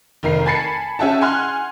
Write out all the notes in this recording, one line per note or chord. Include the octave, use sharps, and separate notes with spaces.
F1 D#3 A#4 C7
G#5 A5 B5 A6 C7 C#7
C#4 G#4 E5 F#5 G5 A5
F#5 G#5 C6 F6 F#6